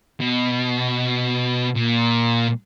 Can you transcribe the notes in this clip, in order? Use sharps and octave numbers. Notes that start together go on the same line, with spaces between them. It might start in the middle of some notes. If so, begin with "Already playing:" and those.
B2
A#2